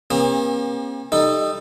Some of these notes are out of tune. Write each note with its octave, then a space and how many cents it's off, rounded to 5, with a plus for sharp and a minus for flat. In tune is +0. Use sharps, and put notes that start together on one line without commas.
A#3 +40 C#4 -45 G4 +45
G3 +15 D#4 -10 A4 +10